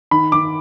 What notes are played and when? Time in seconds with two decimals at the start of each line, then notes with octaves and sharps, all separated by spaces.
0.11 D#3 B5
0.32 D#3 D6